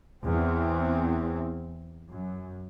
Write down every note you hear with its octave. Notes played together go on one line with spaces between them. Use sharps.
E2 C4
F#2